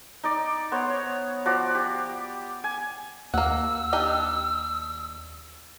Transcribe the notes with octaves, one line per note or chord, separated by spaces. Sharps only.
D#4 D5
B3 C5 C#5
C#5
F3 F#4 D5
G4
G#5
D#2 A#3 F#5 E6
D4 D#4 G4